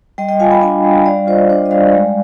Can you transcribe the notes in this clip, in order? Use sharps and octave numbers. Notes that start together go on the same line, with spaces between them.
G3 D#5 G5
D#5 G5
F4 F5 G#5
G5 B5
D4 F5 G#5
G3
G3 D5 F5
F4 C5 D#5
D4 C5 D#5
D#5
G3 D5 F5
G#3